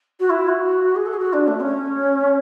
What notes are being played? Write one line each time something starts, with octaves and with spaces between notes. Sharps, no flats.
F#4
E4
F#4
G#4
A4
G#4
F#4
D4
A3
C#4